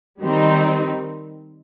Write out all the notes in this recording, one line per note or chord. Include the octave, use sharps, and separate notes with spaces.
D#3 G3 C4 D#4